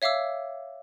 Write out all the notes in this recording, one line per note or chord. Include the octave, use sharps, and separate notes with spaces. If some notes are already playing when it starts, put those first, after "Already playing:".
C#5 E5 F5 D6 E6